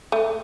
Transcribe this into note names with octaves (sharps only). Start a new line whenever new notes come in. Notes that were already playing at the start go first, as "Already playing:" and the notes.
A3